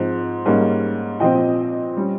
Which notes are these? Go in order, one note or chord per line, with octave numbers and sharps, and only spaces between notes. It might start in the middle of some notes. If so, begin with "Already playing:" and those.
Already playing: G#2 F3 C4
G#2 G3 A#3 C#4
A#2 F3 C4 D#5 G5
G3 C#4